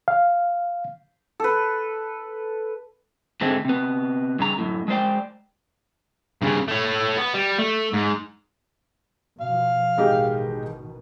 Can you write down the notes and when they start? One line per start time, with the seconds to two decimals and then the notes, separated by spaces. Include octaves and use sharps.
0.08 F5
1.40 A4 B4
3.41 G#2 D3 D#3 G#3 A3 C4
3.65 C3 B3
4.39 G2 C#3 A#5
4.58 F#2 A2
4.88 G#3 A3 C5 D5 G5
6.42 G2 C#3
6.68 A3 C#5
7.17 B3
7.34 G3
7.58 A3
7.93 G#2
9.41 B2 F3 F5
9.98 A1 B2 D#3 G#3 D#4 G4